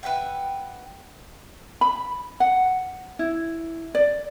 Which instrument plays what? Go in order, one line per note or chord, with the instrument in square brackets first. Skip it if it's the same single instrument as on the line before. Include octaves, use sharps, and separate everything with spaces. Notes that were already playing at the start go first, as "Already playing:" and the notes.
[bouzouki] B4 E5 F#5 G5
[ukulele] B5
F#5
E4
D5